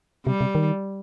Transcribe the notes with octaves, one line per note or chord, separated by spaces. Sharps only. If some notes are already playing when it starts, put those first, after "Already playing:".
C3 G3
C3
D#3